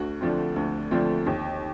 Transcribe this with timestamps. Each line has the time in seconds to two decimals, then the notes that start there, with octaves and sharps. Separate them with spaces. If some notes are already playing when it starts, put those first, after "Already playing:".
Already playing: D2 F#4
0.21 D3 F3 A3 C4
0.56 D2
0.91 D3 F3 A3 C4
1.26 D#2